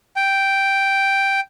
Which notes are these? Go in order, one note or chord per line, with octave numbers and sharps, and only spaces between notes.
G5